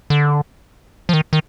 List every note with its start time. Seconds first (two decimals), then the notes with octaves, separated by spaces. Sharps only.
0.10 D3
1.09 F3
1.13 D#3
1.33 D#3